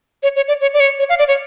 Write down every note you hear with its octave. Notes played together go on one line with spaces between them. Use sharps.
C#5
C#5
D5
C#5
D5
C#5
C#5
F5
D5
C#5